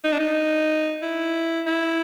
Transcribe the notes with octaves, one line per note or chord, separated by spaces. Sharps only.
D#4
D4
D#4
E4
E4